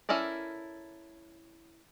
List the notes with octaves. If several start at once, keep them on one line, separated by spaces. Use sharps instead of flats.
C#4 E4 A4 A#4 D5